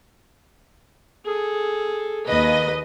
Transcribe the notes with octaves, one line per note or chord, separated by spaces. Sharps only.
G#4 A4
D#2 B4 D#5